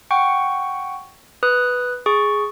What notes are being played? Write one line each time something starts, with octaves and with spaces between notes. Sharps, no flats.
F#5 G5 C#6
B4 D#6 F#6
G#4 C#6